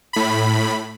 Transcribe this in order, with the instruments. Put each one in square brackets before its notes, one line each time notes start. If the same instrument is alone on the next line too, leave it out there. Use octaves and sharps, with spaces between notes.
[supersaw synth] A2 B5